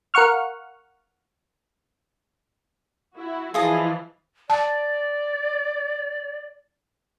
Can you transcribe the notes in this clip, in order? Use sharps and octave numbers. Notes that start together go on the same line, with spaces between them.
A#4 F5 F#5 C#6 F6
E4 F#4
E3 F3 E4 F4 G#4 D#5 A5
D5 A5